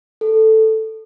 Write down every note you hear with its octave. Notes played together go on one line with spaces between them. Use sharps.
A4